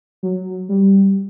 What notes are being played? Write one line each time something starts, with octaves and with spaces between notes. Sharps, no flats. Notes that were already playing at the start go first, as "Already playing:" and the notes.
F#3
G3